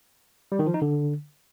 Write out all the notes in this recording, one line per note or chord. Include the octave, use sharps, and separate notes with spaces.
G3
D#3
F3
D#4
D3